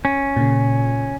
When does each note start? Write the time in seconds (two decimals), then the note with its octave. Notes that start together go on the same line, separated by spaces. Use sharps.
0.05 C#4
0.36 A#2 C#3